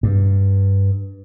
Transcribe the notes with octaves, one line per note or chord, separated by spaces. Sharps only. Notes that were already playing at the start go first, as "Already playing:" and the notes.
G2